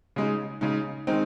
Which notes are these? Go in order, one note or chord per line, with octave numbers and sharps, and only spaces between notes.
C#3 G#3 D#4
C#3 G#3 D#4
D#3 G#3 C4 D#4